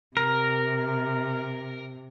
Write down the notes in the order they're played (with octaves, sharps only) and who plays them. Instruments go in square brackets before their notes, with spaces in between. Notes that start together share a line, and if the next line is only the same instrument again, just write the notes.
[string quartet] C3 [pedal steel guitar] A#4